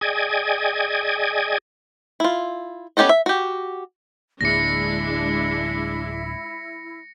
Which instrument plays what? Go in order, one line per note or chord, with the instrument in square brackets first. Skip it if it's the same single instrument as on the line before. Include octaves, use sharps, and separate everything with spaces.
[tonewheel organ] G#4 D5 D#5 G5 G#5 G#6
[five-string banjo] E4 F4
B3 C#4 G4 A4 D#5
E5
F#4 G4
[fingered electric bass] D1 D3 A#3 [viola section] G#3 D4 [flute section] E4 [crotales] A#6 C#7